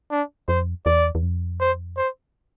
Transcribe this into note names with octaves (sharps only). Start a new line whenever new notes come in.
D4
F2 C5
E2 D5
E2
F2
C5
C5